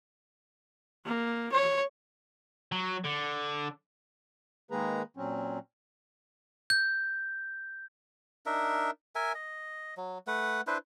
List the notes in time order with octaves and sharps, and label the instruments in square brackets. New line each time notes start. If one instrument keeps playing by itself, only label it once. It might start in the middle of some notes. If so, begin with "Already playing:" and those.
[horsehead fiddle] A#3
C#5
[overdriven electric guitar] F#3
D3
[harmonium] D#3 G#3 A#3 G#4 B4 A#5
A#2 F#3 C4 C#4
[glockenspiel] G6
[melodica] D4 D#4 A#4 E5
A#4 E5 G#5
D#5
F#3
A3 B4 F#5
D4 E4 B4 C5